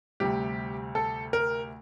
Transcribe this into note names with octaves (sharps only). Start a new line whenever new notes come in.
D2 C3 G3 G4
A4
A#4